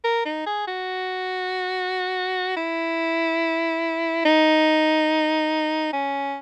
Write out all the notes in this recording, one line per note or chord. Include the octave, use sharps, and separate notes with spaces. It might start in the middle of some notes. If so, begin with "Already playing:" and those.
A#4
D#4
G#4
F#4
E4
D#4
C#4